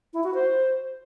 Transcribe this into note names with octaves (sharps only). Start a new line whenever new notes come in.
E4
F#4
C5